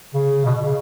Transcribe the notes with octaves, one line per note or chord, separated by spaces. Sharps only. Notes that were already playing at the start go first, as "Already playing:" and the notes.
C#3
B2
B2
C#3